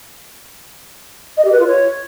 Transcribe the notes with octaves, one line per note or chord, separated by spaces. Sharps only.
D#5
G4
B4
F4
C#5